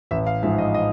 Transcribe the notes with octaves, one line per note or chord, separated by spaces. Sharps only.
A1 E5
F5
G#2 F3 G#3 E5
D#5
D#5